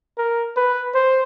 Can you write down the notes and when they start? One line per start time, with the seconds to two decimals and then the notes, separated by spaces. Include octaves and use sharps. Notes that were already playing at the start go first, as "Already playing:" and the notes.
0.18 A#4
0.57 B4
0.95 C5